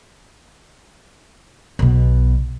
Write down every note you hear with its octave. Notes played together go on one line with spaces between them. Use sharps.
B1 B2